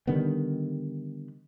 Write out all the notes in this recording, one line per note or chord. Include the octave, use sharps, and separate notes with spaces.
D3 D#3 G3 B3